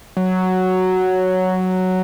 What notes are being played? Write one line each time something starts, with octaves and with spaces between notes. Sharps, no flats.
F#3